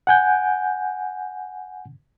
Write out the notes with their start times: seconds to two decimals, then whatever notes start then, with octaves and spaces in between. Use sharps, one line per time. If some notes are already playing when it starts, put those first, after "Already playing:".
0.07 F#5 G#5 G6